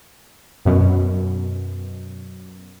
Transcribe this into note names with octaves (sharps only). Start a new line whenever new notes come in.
F#2 B2